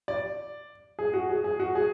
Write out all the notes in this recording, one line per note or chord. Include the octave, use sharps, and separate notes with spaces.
D5
G#4
F#4
G#4
G#4
F#4
G#4